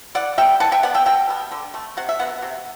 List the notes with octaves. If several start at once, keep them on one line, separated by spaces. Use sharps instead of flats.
E3 D5 F#5
G3 B3 E5 G5
E3 F#5 A5
E5 G5
B3 D5 F#5
E5 G5
B2 E5 G5
G3 B3
D3
A3
C3 F#5
E5
F#3 B3 F#5
C3